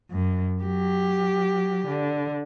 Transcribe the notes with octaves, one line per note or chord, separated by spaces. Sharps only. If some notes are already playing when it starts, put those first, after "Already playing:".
F#2
F#3 G4
D3